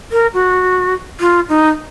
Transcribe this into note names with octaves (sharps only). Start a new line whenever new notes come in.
A#4
F#4
F4
D#4